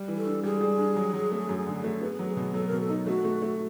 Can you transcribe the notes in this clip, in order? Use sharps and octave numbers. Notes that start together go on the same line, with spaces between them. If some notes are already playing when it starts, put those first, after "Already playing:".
Already playing: G3
E3
A4
D4
G3 G#4
G3
D4
F#3
F#3
A3
F#2
D3
A3
B3 G#4
F#3
G#4
B2
F#3 A4
B2 A#4
A4
D#4
A3 F#4
A3
A3